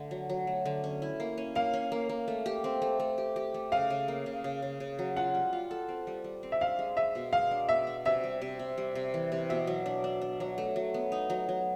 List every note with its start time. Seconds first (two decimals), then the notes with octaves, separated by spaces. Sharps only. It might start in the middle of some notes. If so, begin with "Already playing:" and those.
Already playing: D3 A3
0.11 F#3
0.29 F#3
0.47 A3
0.66 D3
0.84 C#4
1.02 E4
1.20 A#3
1.38 C#4
1.55 A#3 F5
1.73 C#4
1.92 A#3
2.09 A#3
2.28 A3
2.46 G4
2.64 C4
2.82 A3
3.00 A3
3.18 G4
3.36 G4
3.54 A3
3.72 C#3 F5
3.90 C#3
4.08 A#3
4.26 C#3
4.44 C#3
4.62 C#3
4.80 C#3
4.99 F#3
5.16 F4 F#5
5.35 G3
5.53 F4
5.71 A4
5.89 C4
6.07 G3
6.24 G3
6.43 C4
6.52 E5
6.61 D4 F5
6.79 G#3
6.97 G#3 E5
7.15 B2
7.33 G#3 F5
7.51 D4
7.69 B2 E5
7.87 D4
8.05 C3 E5
8.23 G3
8.42 C3
8.59 C3
8.78 G3
8.95 C3
9.14 E3
9.32 C3
9.50 B2 E5
9.67 F#3
9.86 D4
10.04 D4
10.22 D4
10.40 F#3
10.58 A3
10.76 F#3
10.94 B3
11.12 D#4
11.30 F#3
11.49 F#3